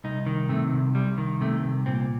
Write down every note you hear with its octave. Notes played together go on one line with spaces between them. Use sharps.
C2 D#4
D#3
C3 A3
C2
C2 G3
D#3
C3 A3
C2
A#2 C4